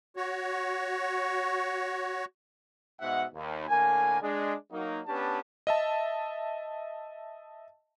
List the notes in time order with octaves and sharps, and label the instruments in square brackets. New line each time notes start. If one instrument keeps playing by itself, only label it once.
[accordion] F#4 C#5
[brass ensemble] G#2 B2 E5 F#5
D#2
A2 D3 A#3 A#4 G#5
G#3 D4 G#4
F#3 A#3 D#4
B3 C#4 D4 G4 B4 A5
[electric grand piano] D#5 E5 A5